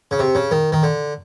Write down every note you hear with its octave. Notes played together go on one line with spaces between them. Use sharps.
C#3
C3
C#3
D#3
D#3
D3